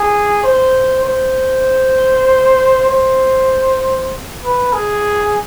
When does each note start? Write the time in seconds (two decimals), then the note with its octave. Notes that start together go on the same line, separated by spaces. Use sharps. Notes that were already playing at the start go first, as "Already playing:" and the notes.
Already playing: G#4
0.43 C5
1.05 C5
2.89 C5
4.43 B4
4.73 G#4